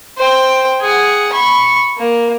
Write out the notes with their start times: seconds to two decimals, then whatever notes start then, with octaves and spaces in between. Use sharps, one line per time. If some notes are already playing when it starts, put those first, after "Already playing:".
0.17 C5 G5
0.81 G#4 F#5
1.33 B5 C#6
1.98 A#3